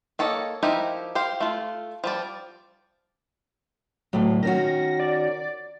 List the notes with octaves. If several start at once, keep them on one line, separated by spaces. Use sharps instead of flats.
A#3 A4 C#5 D#5
F3 D#4 E4 G4 A#4
G4 C5 F5
A3 F4
F3 G3 D5
D2 A2 F#3
D#3 C#4 F#4 A#6
D5